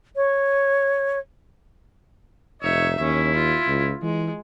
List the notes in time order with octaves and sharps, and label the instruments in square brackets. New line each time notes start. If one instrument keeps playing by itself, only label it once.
[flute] C#5
[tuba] F1 [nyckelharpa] D#4 E5 [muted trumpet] C#5
[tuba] D#2 [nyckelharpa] C#4 [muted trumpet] E4
[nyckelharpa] F4
[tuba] C#2
[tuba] E3 [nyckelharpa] G#3